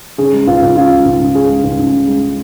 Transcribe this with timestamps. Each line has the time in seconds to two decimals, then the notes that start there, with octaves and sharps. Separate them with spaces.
0.18 C#3 G#4
0.33 G#3
0.47 C#2 F4
0.62 C#2
0.76 C#3 F4
0.91 G#3
1.05 C#2
1.20 C#2
1.34 C#3 G#4
1.49 G#3
1.64 C#2
1.79 C#2
1.93 C#3
2.07 G#3